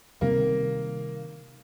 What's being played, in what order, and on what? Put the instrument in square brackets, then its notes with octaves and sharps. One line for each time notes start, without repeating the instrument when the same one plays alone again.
[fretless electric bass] C3 D#3 G3 C4 [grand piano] A#3